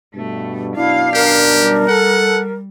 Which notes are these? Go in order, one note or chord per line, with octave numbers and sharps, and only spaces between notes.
G2 B2 A3
F#2 B2 D4 E4 F5
G4 A#4
G3
A4 F#5